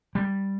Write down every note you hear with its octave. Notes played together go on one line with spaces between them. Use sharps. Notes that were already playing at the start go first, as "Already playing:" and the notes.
G3